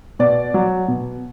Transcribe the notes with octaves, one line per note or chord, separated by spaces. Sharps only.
B2 D5
F#3
B2